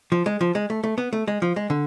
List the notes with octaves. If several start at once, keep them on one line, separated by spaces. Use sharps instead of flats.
F3
G#3
F3
G#3
A3
A3
B3
A3
G#3
F3
G#3
D3